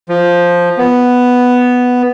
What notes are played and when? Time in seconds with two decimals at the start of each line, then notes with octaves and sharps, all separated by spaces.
0.09 F3
0.78 B3